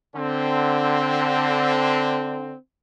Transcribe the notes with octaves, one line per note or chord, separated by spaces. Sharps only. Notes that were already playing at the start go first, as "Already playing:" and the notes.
D3 C4